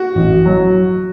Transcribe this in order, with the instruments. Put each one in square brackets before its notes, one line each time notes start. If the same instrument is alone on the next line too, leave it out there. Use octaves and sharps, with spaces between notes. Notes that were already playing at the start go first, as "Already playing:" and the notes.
Already playing: [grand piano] F#4
[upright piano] A1
F#3